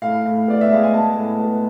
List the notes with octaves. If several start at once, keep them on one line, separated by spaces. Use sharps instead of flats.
A2 F5
A2
B3 D5
E5
G#3 F5
G#5
B3 A5
A2
B3